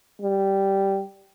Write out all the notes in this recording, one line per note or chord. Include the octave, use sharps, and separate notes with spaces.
G3